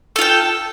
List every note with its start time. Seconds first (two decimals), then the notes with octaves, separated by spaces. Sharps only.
0.16 A4
0.19 F4
0.21 G5